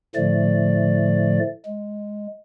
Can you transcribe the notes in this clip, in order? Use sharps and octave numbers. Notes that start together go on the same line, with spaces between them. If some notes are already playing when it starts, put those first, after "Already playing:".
A2 D3 F3 A3 D5
G#3